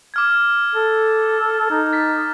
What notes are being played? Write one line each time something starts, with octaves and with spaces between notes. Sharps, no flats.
D6 F6 G#6
A4
D#4
A6 B6